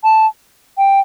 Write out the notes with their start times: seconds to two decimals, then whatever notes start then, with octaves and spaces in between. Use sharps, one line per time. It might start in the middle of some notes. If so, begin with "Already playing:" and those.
0.04 A5
0.78 G5